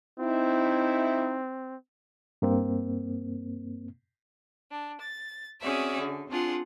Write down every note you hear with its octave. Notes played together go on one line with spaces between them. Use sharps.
C4 D#4 E4
G2 A#3 C4
D4
A6
C4 C#4 F#4 G#4 D5 E5
D3
C4 D4 F4 G#4 F#5